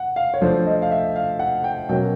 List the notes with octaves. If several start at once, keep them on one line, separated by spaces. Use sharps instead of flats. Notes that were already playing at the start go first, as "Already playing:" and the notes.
Already playing: F#5
F5
C#5
F3 A3 D4 C5
D#5
F5
E5
F5
F#5
G5
B2 F#3 A#3 C#4 G5